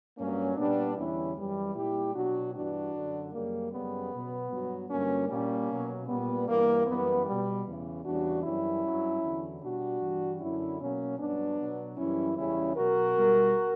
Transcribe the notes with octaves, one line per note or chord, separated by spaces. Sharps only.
G2 F#3 A#3 C#4
A#2 G3 B3 D4
E2 D3 G3 C#4 E4
F#2 E3 G3
A#2 G3 E4 G4
B2 F#3 D4 F#4
G2 E3 G3 D4 F#4
F#2 D3 F#3
F#2 C#3 G3 A#3
F#2 C#3 G3 B3
B2 F#3
G2 F#3
G2 D3 F#3 A#3 C#4
A#2 G3 A#3 C#4
B2 F#3
A#2 G3 B3
G2 E3 G3 A#3
F#2 E3 G3 B3
B2 G3
E2 C#3 E3
E2 C#3 G3 D4 F#4
F#2 E3 G3 C#4 E4
G2 F#3
E2 D3 F#3
B2 G3 D4 F#4
G2 E3 G3
F#2 D3 F#3 C#4 E4
B2 F#3 A#3 C#4
G2 F#3 B3 D4
B2 F#3
F#2 E3 G3 C#4 E4
E2 C#3 G3 C#4 E4
B2 F#3 F#4 A#4
B2 G3